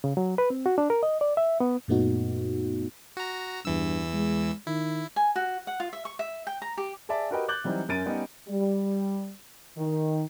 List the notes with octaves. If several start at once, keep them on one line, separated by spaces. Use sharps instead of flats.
C#3
F#3
B4
C4
F#4
D4
A#4
D#5
D5
E5
B3
F#2 A#2 A3 B3 D#4 F#4
F#4 A#5
E2 G2 E3 E6
G#3
D#3 E4
G#5
F#4
F#5
F4
E5
C#6
E5
G5
A#5
G4
G#4 D5 E5 A5
F#4 G4 A#4 B4 D#5 G5
D6 F#6 G6 A6 F#7
E3 F#3 G3 C4 D#4
F#2 C#4 A#4 A6 D7 D#7
G3 B3 C#4 D#4
G3
D#3